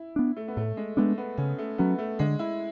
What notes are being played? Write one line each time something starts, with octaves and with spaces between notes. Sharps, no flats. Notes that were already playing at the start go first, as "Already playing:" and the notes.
Already playing: E4
B3 D4
A3
B3
A2 A3
G#3
G#3 A3 B3 D4
B3
C#3 C#4
A3
F#3 B3 C#4
A3
D3 G#3
E4